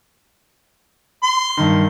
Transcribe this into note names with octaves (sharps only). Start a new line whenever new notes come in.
C6
G2 D#3